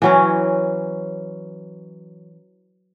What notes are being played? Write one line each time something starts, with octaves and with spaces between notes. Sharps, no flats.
E3 F#3 C#4